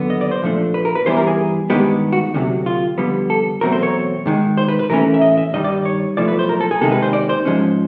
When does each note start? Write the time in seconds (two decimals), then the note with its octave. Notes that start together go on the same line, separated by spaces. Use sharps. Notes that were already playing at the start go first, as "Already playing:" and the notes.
Already playing: D#2 D3 F#3 B3
0.10 D#5
0.21 D5
0.31 C5
0.42 A#2 F3 A3 D4
0.74 B4
0.85 A#4
0.95 B4
1.06 G2 E3 G3 B3 E4 C5
1.17 A#4
1.27 G#4
1.70 G2 D#3 G#3 B3 G4
2.12 F#4
2.34 D2 C3 D#3 F#3
2.66 F4
2.98 F2 D3 G3 B3
3.30 A4
3.61 E2 B2 F#3 A3 C4 A#4
3.72 C5
3.83 C#5
4.26 G#2 D#3 G#3
4.57 C5
4.68 B4
4.79 B4
4.90 A2 E3 A3 C#4 A#4
5.14 E5
5.21 D#5
5.37 E5
5.53 G2 D#3 G3 D#5
5.65 D5
5.85 C#5
6.17 B1 A2 F3 A3 D5
6.28 B4
6.39 C5
6.49 A#4
6.60 A4
6.71 G#4
6.81 C3 D#3 G#3 A4
6.92 B4
7.02 C5
7.13 D5
7.29 C5
7.45 G#2 F3 G#3 C#4